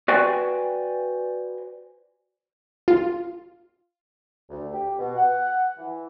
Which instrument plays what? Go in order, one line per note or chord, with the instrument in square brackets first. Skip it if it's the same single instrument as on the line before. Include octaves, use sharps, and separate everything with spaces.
[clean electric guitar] F#4 B4 C5 D5 G5 G#5
[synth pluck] F4
[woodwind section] D2
G4
B2
F#5
E3